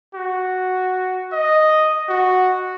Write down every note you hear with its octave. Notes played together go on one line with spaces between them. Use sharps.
F#4
D#5
F#4